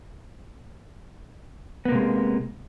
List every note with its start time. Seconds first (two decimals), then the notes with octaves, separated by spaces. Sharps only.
1.85 B3
1.89 A#3
1.92 C3
1.95 G#3